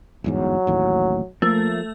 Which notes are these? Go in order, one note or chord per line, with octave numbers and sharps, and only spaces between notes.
G1 E2 G#2 F#3
A1 D#2 A2
F3 A3 A#3